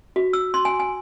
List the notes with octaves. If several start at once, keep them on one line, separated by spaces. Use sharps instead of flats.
F#4
E6
C6
G#5
G#5